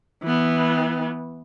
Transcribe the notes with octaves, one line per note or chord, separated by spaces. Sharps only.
E3 B3